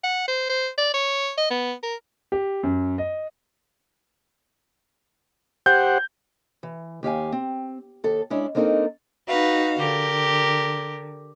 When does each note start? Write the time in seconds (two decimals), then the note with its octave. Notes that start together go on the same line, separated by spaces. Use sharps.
0.04 F#5
0.28 C5
0.49 C5
0.78 D5
0.94 C#5
1.37 D#5
1.50 B3
1.83 A#4
2.32 G4
2.63 F#2
2.98 D#5
5.66 G4 C5 F#5 G6
6.63 E3
7.03 D#2 G4 F5 G#5
7.32 C4
8.04 D#2 A4
8.30 G#3 C#4 D4 E4
8.55 A#3 C4 D4 D#4 A4 A#4
9.27 D#4 F#4 B4 F5
9.79 D3 G4 A#4